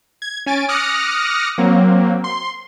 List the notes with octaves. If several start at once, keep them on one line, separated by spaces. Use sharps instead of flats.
G#6
C#4 G#5 A6 D7
D6 D#6 F6 F#6 A#6 C#7
F#3 A#3 C4
C6